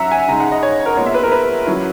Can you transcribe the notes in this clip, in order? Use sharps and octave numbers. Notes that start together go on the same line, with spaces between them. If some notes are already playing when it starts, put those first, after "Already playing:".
Already playing: F#3 C#4 E5 F#5 A#5
G#5
C#3 G#3 D#4 A#5
F#5
D#5
C#5
A#4
A#2 G#3 B3 C#5
E5
B4
A#4
B4
F#3 C#4 E4